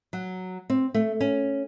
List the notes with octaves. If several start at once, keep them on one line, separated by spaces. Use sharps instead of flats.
F#3
C4
A3
C#4